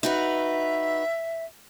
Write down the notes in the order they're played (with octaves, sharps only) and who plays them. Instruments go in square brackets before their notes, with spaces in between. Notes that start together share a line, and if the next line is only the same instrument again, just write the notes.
[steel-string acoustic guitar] D#4 F#4 B4 [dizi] E5